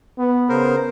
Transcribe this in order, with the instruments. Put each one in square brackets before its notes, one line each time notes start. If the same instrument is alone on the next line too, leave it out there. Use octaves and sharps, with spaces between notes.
[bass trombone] B3
[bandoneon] C#3 A#4 C5